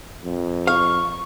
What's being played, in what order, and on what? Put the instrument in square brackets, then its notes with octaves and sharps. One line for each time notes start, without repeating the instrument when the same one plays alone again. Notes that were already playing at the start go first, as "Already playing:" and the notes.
[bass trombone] F2
[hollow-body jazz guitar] F5 [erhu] C#6